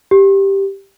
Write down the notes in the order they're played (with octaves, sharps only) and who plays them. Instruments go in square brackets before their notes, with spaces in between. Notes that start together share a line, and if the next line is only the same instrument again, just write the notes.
[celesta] G4